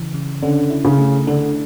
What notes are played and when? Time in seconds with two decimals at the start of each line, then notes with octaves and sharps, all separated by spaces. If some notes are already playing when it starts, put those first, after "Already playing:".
Already playing: C#3 E3
0.14 C#3
0.42 D3 C#4
0.70 E4
0.85 C#3
0.98 A3
1.27 D3 D4